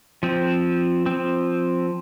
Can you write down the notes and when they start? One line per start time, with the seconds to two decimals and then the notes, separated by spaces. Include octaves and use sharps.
0.23 F3 C4
1.06 F3 C4